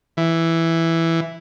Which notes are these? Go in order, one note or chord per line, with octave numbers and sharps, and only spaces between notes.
E3